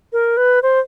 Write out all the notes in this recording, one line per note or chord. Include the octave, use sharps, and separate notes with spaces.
A#4
B4
C5